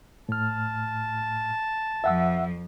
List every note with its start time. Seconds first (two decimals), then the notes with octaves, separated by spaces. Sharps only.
0.29 A2 A5 F6
2.04 F2 F3 E5 F#5 E6